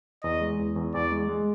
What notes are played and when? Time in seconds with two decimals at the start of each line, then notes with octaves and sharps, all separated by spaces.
0.23 E2 D#5
0.41 G#3
0.59 E2
0.76 E2
0.94 E2 D5
1.12 G#3
1.29 G#3